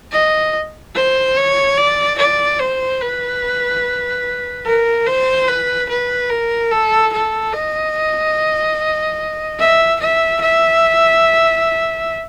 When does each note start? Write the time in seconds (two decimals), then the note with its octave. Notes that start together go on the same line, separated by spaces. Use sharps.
0.12 D#5
0.95 C5
1.37 C#5
1.77 D5
2.18 D5
2.60 C5
3.01 B4
4.66 A#4
5.06 C5
5.48 B4
5.89 B4
6.30 A#4
6.71 A4
7.12 A4
7.53 D#5
9.60 E5
10.00 E5
10.41 E5